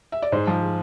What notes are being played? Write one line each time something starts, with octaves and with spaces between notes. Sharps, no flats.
E5
D5
G#2 C5
F3